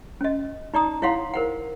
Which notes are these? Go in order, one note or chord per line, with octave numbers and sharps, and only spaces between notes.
C#4 D#5
D#4 D5 A#5 D#6
E4 C#5 F5 F#5 C6
A#4 C5 F#5